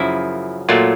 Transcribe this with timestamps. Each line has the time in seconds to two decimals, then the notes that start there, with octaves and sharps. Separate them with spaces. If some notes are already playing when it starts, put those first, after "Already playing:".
Already playing: F#2 C#3 F3 E4
0.69 A#2 F#3 A3 F4